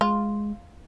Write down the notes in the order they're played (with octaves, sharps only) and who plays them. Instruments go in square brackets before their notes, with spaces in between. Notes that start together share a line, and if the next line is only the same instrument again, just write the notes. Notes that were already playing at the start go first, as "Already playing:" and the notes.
[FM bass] G#3 [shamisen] F4